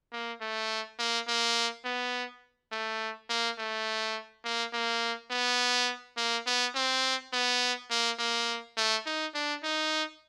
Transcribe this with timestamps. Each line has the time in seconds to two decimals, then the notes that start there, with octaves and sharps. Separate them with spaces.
0.13 A#3
0.41 A3
0.99 A#3
1.28 A#3
1.85 B3
2.72 A3
3.30 A#3
3.59 A3
4.45 A#3
4.73 A#3
5.31 B3
6.17 A#3
6.46 B3
6.75 C4
7.33 B3
7.91 A#3
8.19 A#3
8.77 A3
9.06 D#4
9.35 D4
9.64 D#4